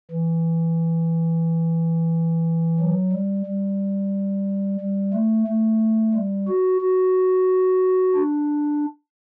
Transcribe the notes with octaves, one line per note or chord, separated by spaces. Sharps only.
E3
F#3
G3
G3
G3
A3
A3
G3
F#4
F#4
D4